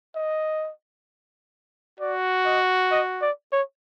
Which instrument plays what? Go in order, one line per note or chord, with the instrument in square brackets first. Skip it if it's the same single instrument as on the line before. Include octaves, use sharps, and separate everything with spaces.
[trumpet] D#5
[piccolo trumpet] F#4 [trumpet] D5
[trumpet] D#5
D#5
D5
C#5